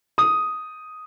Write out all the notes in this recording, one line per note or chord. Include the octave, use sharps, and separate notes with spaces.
D#6